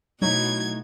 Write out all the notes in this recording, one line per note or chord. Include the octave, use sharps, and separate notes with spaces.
B2 F#3 A3 D#4 E4 G#6